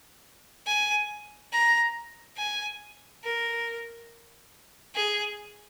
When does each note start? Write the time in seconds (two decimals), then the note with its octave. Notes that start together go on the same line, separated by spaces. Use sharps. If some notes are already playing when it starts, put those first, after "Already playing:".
0.67 G#5
1.53 A#5
2.37 G#5
3.24 A#4
4.95 G#4